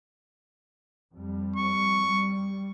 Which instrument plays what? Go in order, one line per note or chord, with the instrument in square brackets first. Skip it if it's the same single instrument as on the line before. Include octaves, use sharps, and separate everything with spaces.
[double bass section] F2 G3
[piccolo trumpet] C#6
[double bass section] G3